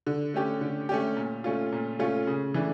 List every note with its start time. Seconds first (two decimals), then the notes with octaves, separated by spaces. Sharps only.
0.07 D3
0.34 A3 C#4 G4
0.61 D3
0.89 A3 C#4 G4
1.17 A#2
1.44 A3 C#4 F4
1.72 A#2
1.99 A3 C#4 F4
2.27 C#3
2.54 E3 A3 D4